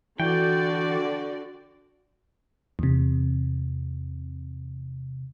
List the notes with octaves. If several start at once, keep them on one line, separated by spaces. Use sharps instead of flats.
D3 E3 F#4 D5 G5
E2 C3